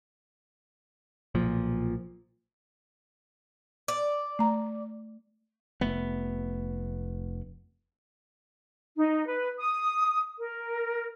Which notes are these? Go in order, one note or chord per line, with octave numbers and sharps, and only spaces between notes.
B1 A#2 F3
D5
A3 A#5
F1 A3 B3
D#4
B4
D#6
A#4